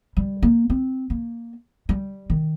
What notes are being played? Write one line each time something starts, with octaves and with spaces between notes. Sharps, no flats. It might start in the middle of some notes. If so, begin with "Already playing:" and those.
G3
A#3
C4
A#3
G3
D#3